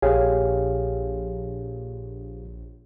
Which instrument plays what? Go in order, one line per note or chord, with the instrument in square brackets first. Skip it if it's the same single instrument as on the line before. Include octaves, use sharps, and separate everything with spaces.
[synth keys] A#1 [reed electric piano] G4 G#4 F5 [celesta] C#5